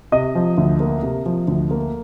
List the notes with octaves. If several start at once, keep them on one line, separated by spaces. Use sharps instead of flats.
C3 D#5
F3
D2
A#3
C3
F3
D2
A#3